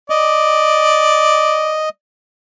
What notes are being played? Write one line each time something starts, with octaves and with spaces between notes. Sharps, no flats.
D5 D#5